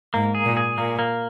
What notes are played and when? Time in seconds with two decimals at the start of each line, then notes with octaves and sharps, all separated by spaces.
0.14 G#2 A#3
0.35 G#4
0.45 A#2
0.57 G#4
0.77 A#2 A#3
0.99 A#3